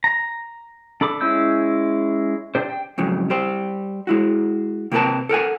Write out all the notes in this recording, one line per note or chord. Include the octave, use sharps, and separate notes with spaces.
A#5
D4 A4 B5 D6
G#3 C#4 E4 E6 G6
D4 G4 C5
G5
F2 G#2 C#3 F#3
G3 G4 C5
G#3 E4 F#4
C3 A#3 F#4 A#4 B4 A5
A4 A#4 F#5 G#5